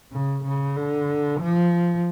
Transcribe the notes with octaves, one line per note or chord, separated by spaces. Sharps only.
C#3
C#3
D3
F3